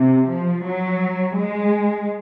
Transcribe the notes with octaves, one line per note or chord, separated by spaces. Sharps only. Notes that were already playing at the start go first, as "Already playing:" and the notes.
Already playing: C3
F3
F#3
G#3